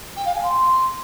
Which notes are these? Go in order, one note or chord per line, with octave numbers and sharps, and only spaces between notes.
G5
F5
G#5
C6